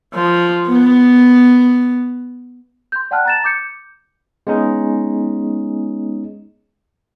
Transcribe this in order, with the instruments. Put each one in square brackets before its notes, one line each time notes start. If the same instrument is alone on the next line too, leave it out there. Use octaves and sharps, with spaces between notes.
[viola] F3
B3
[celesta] C6 G6
D5 F#5 G5 A5 F6 F#6
A#5 A6 E7
D6 G6 C#7
[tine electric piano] G#3 B3 C#4 D#4 G#4